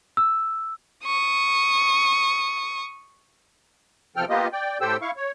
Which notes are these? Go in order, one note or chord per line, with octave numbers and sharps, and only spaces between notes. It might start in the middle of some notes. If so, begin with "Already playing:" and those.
E6
C#6 D#6
E2 C3 F3 A4 G5 F6
A#3 B3 F4 G4 D#5
D5 G5
A2 G4 A4 C5 G5 E6
E4 F5 C#6
C#5